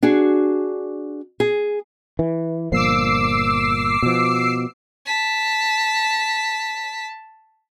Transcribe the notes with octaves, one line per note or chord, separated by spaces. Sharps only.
D4 F#4 G#4
G#4
E3
G1 A#2 F3 D6 E6 C7
B2 F3
A5 B6